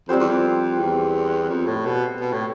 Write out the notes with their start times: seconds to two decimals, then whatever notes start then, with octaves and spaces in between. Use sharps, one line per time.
0.08 F2 G3 C4 G4 C5
0.19 E2
0.30 F2
0.79 E2
1.49 F2
1.67 A2
1.85 B2
2.21 B2
2.33 A2